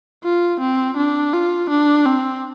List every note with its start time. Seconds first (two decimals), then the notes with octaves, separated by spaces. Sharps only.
0.24 F4
0.60 C4
0.97 D4
1.33 F4
1.70 D4
2.06 C4